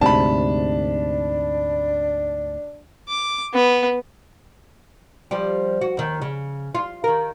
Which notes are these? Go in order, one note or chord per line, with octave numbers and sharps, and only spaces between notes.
D2 G#2 C3 D4 A5 B5
D6
B3
F3 G3 G4
F#4
D#2 D#3
C#3
F4
D#3 A#4